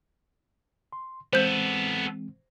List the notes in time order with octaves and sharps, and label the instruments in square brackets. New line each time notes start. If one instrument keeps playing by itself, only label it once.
[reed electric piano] C6
[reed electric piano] E3 G#3 C4 [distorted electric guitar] B3 A4 [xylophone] C5 G6